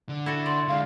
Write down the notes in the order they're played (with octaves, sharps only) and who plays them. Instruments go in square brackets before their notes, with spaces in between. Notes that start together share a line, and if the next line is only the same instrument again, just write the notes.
[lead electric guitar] D3
[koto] E4 F#4 A4
[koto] D5 [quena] C6
[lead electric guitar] D3 G#3 [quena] F5